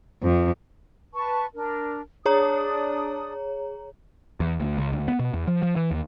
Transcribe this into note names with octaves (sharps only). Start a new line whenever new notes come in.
F2
B4 A5 C#6
D4 A#4
D4 G#4 C#5 D5 A#5 D#6
E2
D2
C#2
D2
B3
B2
E2
F3
F3
E3
D#2